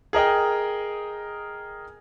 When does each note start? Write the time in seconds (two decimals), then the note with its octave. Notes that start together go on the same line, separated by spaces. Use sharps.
0.13 G#4 A#4 D#5 G5